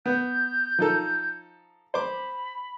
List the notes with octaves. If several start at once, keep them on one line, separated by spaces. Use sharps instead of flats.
B3 G6
F3 D#4 A4
C5 B5 D6